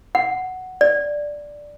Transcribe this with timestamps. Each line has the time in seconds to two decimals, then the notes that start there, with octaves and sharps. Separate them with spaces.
0.15 F#5
0.81 D5